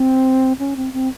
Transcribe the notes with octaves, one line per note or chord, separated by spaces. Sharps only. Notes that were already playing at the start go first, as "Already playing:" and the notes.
Already playing: C4
C#4
C4
C4